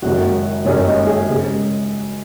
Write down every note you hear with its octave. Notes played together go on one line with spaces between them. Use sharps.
F#1 F#2 D#3 G#3 F#4
F#1 F#2 D#3 G#3 C#4
D#4
G#4
C#3 G#3